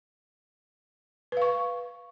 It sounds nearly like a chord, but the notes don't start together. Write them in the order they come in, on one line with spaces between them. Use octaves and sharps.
B4 F5 C#6